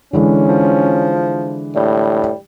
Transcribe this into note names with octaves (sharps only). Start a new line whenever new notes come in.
D3 E3 G#3 C#4
F3
A2 G3